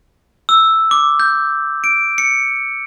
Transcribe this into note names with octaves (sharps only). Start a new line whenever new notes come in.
E6
D6
G6
D7
C#7